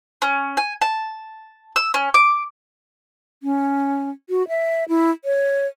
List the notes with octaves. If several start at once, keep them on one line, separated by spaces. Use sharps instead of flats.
C#4
G#5
A5
E6
C#4
D6
C#4
F#4
E5
E4
C#5